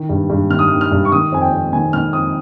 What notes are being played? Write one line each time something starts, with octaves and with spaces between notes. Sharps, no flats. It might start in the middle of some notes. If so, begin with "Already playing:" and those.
Already playing: D#3
G2
G2
D#3 F6
D#6
D#3 F6
F6
G2
C#6
D#3 D#6
F2 G#5
G5
F2
D#3 G#5
D#3 F6
F2 D#6